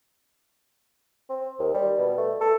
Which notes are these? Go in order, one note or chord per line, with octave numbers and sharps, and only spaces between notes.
C4
D#2
G3
B2
A3
A4